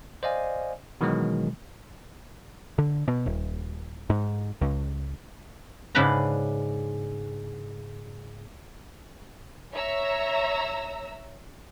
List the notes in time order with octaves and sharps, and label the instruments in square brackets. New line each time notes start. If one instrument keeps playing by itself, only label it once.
[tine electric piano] C5 D5 D#5 F5 G#5
B2 D#3 E3 F#3 G#3
[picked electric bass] D3
B2
D#1
G#2
C#2
[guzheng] G#2 C#3 D4 B4 A#5
[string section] C#5 E5 A#5 E6